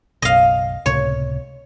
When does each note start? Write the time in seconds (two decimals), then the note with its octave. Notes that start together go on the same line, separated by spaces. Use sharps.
0.22 F#1 B1 D#5 F5
0.86 C#2 A2 C3 C#5